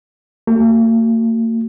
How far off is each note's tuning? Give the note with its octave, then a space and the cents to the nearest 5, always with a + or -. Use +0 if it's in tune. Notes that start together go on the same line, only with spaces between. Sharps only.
A#3 -45 F#4 +20